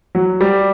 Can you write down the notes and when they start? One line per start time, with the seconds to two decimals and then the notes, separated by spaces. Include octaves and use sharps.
0.15 F#3
0.41 G3